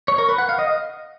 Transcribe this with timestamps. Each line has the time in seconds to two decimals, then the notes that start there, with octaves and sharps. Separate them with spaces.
0.08 C#5
0.18 A#4
0.29 B4
0.38 F#5
0.49 F5
0.59 D#5